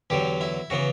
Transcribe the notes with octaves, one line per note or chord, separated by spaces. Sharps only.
E2 D3 F#3 G4
E4
C#3 E3 B3 F#4